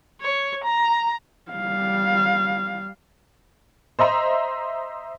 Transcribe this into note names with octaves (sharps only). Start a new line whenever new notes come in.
C#5
A#5
G3 F5
C5 D#5 E5 A#5 C6